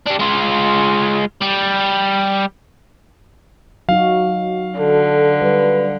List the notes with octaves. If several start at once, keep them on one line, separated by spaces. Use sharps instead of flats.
G3 D4
G#3 F4
G3
F#3 D#4 F#4 F5
D3 A4
G3 B4